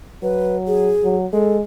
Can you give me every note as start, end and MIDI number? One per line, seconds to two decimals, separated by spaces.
0.23 0.94 54
0.23 0.57 71
0.67 1.17 68
1.03 1.26 54
1.33 1.62 56
1.33 1.58 69